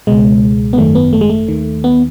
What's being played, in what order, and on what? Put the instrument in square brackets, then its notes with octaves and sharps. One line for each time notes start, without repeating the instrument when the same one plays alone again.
[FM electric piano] C#2 B2 G#3
B3
G#1 F#2 D#3 A3
B3
A3
G#3
A3
D#2 D#3
B3